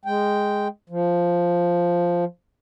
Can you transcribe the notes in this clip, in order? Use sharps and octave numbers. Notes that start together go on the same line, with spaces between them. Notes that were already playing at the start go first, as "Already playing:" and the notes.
G#3 G5
F3